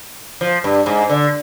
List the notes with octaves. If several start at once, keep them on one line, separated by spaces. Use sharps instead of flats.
F3
G2
G#2
D3